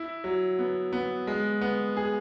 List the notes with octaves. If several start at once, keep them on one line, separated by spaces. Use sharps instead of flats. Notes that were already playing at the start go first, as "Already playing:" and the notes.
Already playing: E4
F#3
B3
B3
G#3
B3
G#4